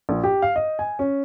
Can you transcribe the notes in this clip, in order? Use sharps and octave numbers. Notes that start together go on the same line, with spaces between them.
A#1
G4
F5
D#5
G#5
C#4